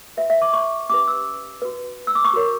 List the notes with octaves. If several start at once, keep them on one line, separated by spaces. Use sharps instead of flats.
F#4 B4 E5
E5
D6
C#6
C#4 G4 B4 D6
E6
F#4 B4
E6
D6
C#6
F#4 A#4 C#5